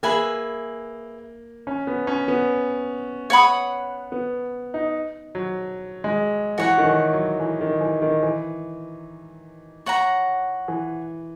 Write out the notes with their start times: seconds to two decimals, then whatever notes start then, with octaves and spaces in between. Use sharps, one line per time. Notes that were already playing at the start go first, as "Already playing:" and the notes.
0.03 A#3 G#4 B4 E5 G#5
1.67 C#4
1.87 B3
2.07 C#4
2.28 B3
3.30 C#5 F#5 B5 D#6
4.12 B3
4.74 D#4
5.35 F#3
6.04 G#3
6.58 E3 F#4 C#5 F#5
6.78 D#3
6.85 E3
7.13 F#3
7.40 E3
7.61 D#3
7.81 E3
8.02 D#3
8.23 E3
9.86 C#5 F#5 A#5
10.68 E3